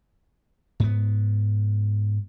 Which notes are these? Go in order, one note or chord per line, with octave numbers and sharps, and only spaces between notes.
G#2 B3